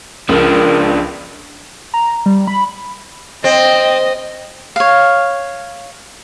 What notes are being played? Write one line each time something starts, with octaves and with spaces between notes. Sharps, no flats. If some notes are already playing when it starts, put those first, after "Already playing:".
C#2 F3 D4 A#4
A#5
G3
B5
C4 D#5
C#5 F5